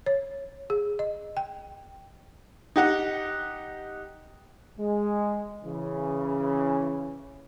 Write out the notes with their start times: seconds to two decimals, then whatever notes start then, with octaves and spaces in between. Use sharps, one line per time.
0.06 C#5
0.70 G#4
0.99 D#5
1.37 G5
2.76 D#4 G4 F#5
4.78 G#3
5.64 C#3 E3